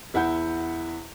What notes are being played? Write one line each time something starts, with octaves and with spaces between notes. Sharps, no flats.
E2 E4 F#5 G6